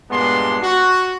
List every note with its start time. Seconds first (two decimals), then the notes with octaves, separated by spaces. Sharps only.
0.11 G2 A#2 G#3 B3 D4 C6
0.63 F#4